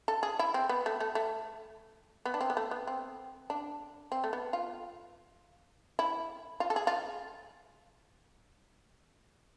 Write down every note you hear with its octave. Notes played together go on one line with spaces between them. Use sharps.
A4
G#4
E4
C4
B3
A3
A3
A3
B3
D4
C4
B3
A3
B3
C4
D4
C4
A3
B3
F4
E4
F4
A4
G#4
F4